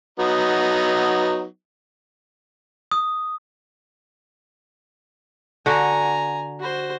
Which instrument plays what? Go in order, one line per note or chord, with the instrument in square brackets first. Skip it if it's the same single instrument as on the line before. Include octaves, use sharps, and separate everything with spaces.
[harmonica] F#3 B3 D#4
[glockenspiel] D#6
[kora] D3 F#4 [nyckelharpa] G#5 A#5
[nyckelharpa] F#4 C5